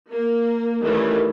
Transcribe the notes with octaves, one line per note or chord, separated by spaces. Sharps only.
A#3
D#3 E3 G3 A3 C#4